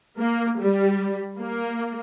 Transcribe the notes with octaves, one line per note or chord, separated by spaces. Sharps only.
A#3
G3
A#3